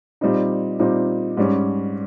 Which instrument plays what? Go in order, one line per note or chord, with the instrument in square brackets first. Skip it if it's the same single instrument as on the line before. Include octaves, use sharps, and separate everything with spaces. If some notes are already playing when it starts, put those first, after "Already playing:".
[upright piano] A#2 G3 C4 D#4
A#2 G3 C4 D#4
G#2 G3 C#4